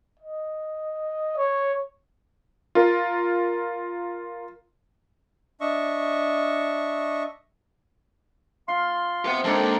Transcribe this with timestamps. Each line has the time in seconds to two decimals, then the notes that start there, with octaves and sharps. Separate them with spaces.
0.20 D#5
1.37 C#5
2.75 F4 A#4
5.61 D4 D#5 E5 C#6
8.68 F4 F5 C6
9.25 C3 B4 F#5
9.45 D#3 G#3 A#3 D4 A4